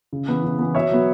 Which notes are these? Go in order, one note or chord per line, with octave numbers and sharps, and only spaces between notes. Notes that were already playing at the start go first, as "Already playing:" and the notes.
C#3
E3 B3
C#3
E3 B3
B2 C#5 E5
F#3 B3